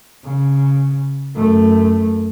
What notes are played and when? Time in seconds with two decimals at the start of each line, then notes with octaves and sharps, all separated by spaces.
0.24 C#3
1.35 F#2 A3